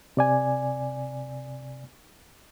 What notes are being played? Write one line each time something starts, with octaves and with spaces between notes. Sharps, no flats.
C3 D5 G#5